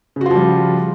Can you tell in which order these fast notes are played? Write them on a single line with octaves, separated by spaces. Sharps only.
C#3 F#4 F4 F3 G3